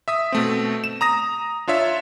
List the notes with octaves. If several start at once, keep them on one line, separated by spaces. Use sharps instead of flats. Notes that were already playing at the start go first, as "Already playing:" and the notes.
E5 D#6 B6
B2 A3 C4
E7
A#5 D#6 A#6
D4 F4 C#5 E5